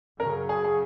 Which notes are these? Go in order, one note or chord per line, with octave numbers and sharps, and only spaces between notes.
F#2 C#3 F#3 A#4
G#4
G#4